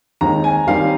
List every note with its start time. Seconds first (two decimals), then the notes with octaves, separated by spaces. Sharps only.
0.21 D#2 D#3 G#3 C4 D#4 A#5
0.44 G#5
0.67 D#2 D#3 G3 C4 F5